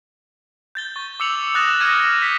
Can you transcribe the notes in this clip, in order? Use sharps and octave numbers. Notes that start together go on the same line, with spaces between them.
G6 A6 G7
C#6
D6 E6 C#7 F7 F#7
D#6 F#6 A6 A#6 E7
D6 F6 F#6 G#6 A#6 D#7
G6 B6